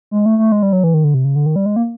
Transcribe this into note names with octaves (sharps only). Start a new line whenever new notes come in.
G#3
A3
A3
G#3
G3
F#3
E3
D#3
D3
C3
C#3
D3
D#3
G3
G#3
A#3